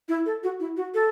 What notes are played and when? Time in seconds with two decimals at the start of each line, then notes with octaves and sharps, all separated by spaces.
0.09 E4
0.26 A4
0.44 F#4
0.60 E4
0.77 F#4
0.94 A4